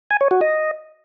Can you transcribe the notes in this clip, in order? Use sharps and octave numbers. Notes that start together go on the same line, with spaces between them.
G#5
C#5
F#4
D#5